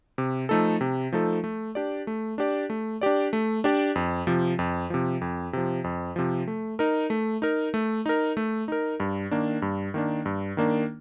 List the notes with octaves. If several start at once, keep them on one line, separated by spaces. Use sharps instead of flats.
C3
F3 A3 D#4 A4
C3
F3 A3 D#4 A4
A3
D4 G4 D5
A3
D4 G4 D5
A3
D4 G4 D5
A3
D4 G4 D5
F2
C3 F3
F2
C3 F3
F2
C3 F3
F2
C3 F3
A3
D#4 A#4
A3
D#4 A#4
A3
D#4 A#4
A3
D#4 A#4
G2
D#3 A#3 D4
G2
D#3 A#3 D4
G2
D#3 A#3 D4